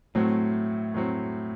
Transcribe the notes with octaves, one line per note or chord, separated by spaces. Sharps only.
A2 F#3 A3 C4
A2 F#3 C4